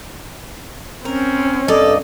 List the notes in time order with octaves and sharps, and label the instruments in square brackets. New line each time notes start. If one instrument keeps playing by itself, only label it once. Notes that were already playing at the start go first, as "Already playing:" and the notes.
[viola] C4 C#4 [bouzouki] A#4
[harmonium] G2 D#5 [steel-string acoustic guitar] A4 [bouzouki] A#4 D5